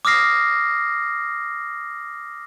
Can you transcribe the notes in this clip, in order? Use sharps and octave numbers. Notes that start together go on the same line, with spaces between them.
D6 D#6 F6 A#6 C7